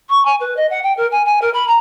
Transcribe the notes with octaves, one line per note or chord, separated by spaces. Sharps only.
C#6
G#5
B4
D#5
F#5
G5
A#4
G#5
G#5
A#4
B5
A#5